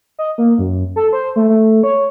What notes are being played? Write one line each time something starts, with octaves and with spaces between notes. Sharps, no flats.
D#5
A#3
F#2
A4
C5
A3
A3
C#5